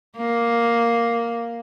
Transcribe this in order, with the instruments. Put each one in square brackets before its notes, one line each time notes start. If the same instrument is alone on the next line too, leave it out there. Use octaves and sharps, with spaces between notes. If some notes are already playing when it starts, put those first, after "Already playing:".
[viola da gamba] A#3